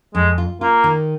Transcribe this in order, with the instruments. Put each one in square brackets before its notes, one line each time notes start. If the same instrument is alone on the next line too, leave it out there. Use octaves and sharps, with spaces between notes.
[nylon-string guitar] F2 [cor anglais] G#3
[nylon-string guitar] F4
[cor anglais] A#3 [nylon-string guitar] F4
[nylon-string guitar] D#3